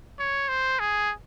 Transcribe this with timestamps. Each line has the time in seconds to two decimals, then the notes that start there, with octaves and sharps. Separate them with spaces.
0.19 C#5
0.49 C5
0.79 G#4